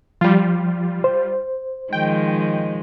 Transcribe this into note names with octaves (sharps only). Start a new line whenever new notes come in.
F3 G3 F4
C5
D#3 F3 G#3 G5